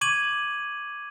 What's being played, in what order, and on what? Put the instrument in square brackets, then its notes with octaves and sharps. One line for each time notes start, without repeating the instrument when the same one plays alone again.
[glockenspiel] C#6 D6 G#6 D#7 F#7